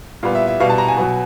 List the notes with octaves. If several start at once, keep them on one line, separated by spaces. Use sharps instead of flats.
A#2 G3 B3 F5
E5
E5
B2 G3 B3 F5
A5
A#5
G#5
B2 F#3 B3